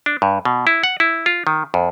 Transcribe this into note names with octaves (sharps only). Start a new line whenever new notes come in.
D4
G2
B2
E4
F#5
E4
F4
D#3
F2